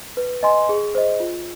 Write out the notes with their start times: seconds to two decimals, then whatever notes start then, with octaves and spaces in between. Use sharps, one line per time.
0.17 B4
0.43 D#5 G#5 C6
0.69 G#4
0.95 C5 D#5
1.20 F4